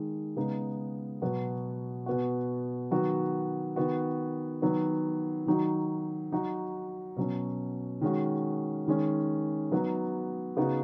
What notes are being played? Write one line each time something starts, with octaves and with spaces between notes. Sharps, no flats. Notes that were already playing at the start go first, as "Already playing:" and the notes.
Already playing: D#3 G#3
C#3 G#3 B3 D#4
B2 F#3 B3 F#4
B2 B3 F#4
D#3 F#3 B3 F#4
D#3 B3 F#4
D#3 F#3 B3
D#3 F#3 D#4 F#4
F#3 D#4 F#4
B2 F#3 C#4
D#3 G#3 C#4 F#4
D#3 G#3 C#4
F#3 B3 D#4 F#4
C#3 B3 D#4 F#4